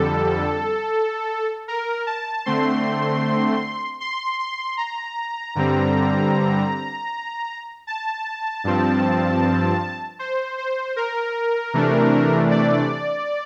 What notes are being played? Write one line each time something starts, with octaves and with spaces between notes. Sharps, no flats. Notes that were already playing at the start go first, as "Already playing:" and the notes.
Already playing: F2 D3 G3 A4
A#4
A5
D3 A3 C4 C6
C6
C6
A#5
G2 D3 G3 C4
A5
G2 F3 C4
C5
C5
A#4
C3 E3 A3 D4
D5